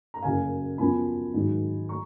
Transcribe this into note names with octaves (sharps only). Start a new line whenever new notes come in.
A#5
F#1 F#2 C#3 F5 G#5
F#2 F3 B3 G#5 B5
G#2 D#3 F#3
A#5 C#6